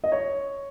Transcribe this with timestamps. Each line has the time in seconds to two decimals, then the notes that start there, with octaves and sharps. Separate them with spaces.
0.04 D#5
0.12 C#5